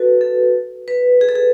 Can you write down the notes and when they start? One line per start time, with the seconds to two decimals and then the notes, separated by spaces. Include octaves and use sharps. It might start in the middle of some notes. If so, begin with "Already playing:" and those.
Already playing: F#4 A4 B4
0.21 A4
0.88 B4
1.21 G#4
1.29 A4
1.35 G#4